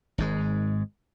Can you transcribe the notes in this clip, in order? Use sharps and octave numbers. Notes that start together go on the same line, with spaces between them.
G#1 G#2 G#3